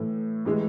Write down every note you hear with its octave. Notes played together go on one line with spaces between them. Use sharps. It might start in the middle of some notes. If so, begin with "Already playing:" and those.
Already playing: A2 E3 A3
A2 E3 G#3